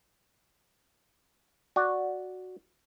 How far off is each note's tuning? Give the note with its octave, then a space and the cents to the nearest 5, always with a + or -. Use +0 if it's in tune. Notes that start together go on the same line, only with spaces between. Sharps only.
F#4 -5 D5 +0